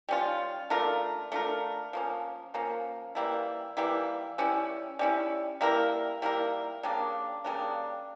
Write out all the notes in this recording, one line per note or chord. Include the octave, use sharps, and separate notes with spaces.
G3 C#4 F4
A3 D4 F4 A#4
A3 D4 F4 A#4
F3 A#3 C#4
F3 A#3 C#4
E3 G3 A#3 E4
E3 G3 A#3 E4
G3 C#4 E4
G3 C#4 E4
G3 A#3 E4 A#4
G3 A#3 E4 A#4
C#3 G3 A#3 D4
C#3 G3 A#3 D4